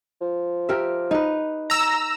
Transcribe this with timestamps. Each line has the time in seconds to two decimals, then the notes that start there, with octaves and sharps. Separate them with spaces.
0.21 F3
0.69 G4 A#4 E5
1.11 D#4 B4
1.70 A#5 E6